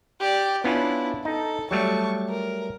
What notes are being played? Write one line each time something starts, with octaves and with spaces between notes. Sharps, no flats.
G4 D5
B3 C#4 D4 E4 F4
D#4 A4
F#3 G3 A3 A5 C#6
A#4